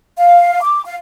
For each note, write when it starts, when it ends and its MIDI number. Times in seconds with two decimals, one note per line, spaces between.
0.18 0.62 77
0.62 0.83 86
0.86 0.96 77